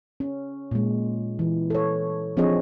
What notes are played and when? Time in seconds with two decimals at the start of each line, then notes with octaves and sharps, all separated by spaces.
0.20 C#4
0.71 A#2 G#3
1.39 E3
1.70 A4 C#5
2.37 F3 C4 D4 G#4 C#5 D#5